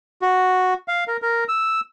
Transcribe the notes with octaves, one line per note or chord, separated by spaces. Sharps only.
F#4
F5
A#4
A#4
E6